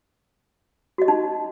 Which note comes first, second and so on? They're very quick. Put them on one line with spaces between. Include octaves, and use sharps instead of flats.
F#4 D#5 G4 D#4